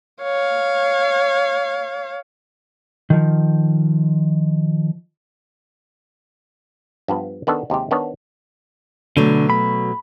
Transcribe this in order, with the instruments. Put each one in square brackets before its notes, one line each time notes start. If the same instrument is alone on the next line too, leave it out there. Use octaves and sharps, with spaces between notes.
[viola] C#5 F5
[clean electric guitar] D#3 F3
[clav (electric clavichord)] G2 F3 B3
D#3 B3 D4 A4
D#2 C3 G#3 G4
D#3 B3 D4 C#5
[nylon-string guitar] B2 F#3 A3 [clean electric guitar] D3
[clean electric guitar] B5